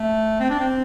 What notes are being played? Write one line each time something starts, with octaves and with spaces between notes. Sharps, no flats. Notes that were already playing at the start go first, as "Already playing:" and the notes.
Already playing: A3
C4
D4
C4